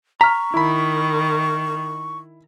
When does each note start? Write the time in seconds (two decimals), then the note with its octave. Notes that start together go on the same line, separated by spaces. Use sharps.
0.21 A#5 C#6 F6 B6
0.54 D#3 E4 B5